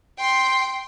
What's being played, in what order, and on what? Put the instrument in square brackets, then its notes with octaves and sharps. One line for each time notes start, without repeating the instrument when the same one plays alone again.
[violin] G5 C6